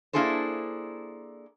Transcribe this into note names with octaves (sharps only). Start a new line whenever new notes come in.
A#3 D4 E4 G#4 A4 C5